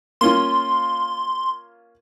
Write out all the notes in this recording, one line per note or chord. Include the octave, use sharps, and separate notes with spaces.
A#3 C#4 F4 C6